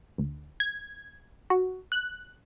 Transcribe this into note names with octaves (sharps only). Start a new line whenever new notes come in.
D2
G#6
F#4
F#6